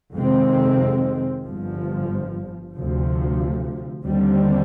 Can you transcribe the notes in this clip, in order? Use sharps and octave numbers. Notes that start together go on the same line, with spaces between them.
F2 C3 D#3 G#3 C4
G1 G2 F3
D2 C3 F3
D#2 D3 G3 C4